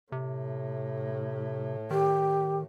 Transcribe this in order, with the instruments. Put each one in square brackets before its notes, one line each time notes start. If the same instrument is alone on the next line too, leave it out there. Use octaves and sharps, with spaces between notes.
[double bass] A2 [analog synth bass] C3
[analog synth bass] D#3 [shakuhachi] G4